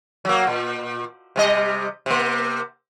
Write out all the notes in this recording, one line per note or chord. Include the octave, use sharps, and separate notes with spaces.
F#3 A#3
A#2
C3 G3 D#5
C3 A#3